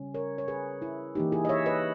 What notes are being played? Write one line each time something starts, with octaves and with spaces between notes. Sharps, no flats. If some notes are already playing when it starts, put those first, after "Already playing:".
Already playing: C#3 G3 C#4
A#4 C#5
C#5
G#4 B4
E4
E3 A#3 D#4 G4
E4 G#4
D#5
C#5 E5
B4 D#5